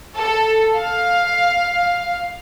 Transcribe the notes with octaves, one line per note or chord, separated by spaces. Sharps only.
A4
F5